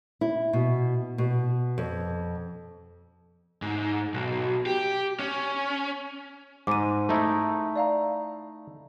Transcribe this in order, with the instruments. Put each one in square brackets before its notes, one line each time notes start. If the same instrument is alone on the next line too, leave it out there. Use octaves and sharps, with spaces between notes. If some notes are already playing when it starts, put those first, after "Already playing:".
[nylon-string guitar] E4
B2
B2
F2
[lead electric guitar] G#2
B1
G4
C#4
[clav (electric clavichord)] G#2 [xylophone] D6 D#7
[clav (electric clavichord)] A3 D#4 E4
[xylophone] D5 F5 A#5